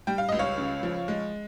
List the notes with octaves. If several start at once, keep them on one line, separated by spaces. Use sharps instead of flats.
G3 G5
F5
C#2 D#5
C#5 F5
C#3
F3
G#3